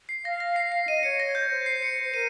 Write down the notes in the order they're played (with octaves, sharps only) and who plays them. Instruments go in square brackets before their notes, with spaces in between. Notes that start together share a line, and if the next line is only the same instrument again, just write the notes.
[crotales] C7
[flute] F5 [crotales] A#6
[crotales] A#6
C7
C7
[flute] D#5 [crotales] D#7
[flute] C#5 [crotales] C#7
[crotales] A#6
[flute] C#5 [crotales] G6
[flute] C5
[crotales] C7
C#7
[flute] C5
[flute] A#4 [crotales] D#7